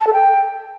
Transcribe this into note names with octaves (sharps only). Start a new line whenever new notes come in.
A5
A4
G5